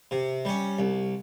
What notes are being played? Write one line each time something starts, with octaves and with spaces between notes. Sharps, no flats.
C3
G3 C#4
C2